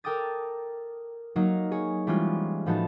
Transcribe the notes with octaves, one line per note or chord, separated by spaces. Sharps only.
A4 A#4 G5 D6 D#6 A6
F#3 A#3 D#4
G#4 C#5
E3 G3 G#3 C4 C#4 F4
A2 F3 B3 D#4 F#4 A5